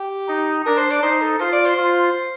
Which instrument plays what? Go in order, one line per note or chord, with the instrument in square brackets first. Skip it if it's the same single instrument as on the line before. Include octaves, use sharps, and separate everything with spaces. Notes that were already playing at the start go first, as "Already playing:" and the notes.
Already playing: [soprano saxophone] G4
[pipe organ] D#4
[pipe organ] D4 [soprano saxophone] A#4
[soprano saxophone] C5
D5
[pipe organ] D#4 [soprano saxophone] C5
[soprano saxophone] A4
[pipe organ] F4 [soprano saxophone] C5
[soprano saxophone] D5
C5
[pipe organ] F4